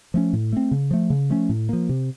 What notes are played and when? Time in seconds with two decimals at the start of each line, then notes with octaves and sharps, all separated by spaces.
0.14 F3 A3 C#4
0.33 A2
0.53 A3 C4
0.71 C#3
0.91 F3 A3
1.10 C#3
1.30 F3 A3 C#4
1.49 A2
1.69 F3 A#3
1.89 C3